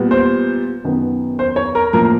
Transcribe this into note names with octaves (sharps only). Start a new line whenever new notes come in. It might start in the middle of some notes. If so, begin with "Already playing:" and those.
Already playing: A#2 G3 B3
C5
F#2 D#3 F#3 B3
C5
C#5
A#4
A2 F3 A#3 A#4